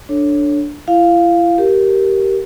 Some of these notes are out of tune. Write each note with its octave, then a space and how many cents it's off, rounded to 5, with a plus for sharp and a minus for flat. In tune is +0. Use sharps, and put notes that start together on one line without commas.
D4 +0 A4 +5 C#5 +0
E4 +40 F5 +0
G4 -15 A#4 +0